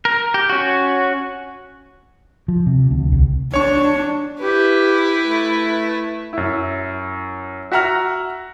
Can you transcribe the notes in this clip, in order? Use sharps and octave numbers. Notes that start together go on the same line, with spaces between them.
A#4
G4
C#4 F#4
F3
C3
D2
C2
D4 C#5 C#6
E4 G4 B4
A3
F#2 E4
F#4 E5 F#5 A#5 F6